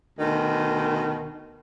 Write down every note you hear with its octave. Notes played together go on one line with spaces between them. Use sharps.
D2 B2 D#3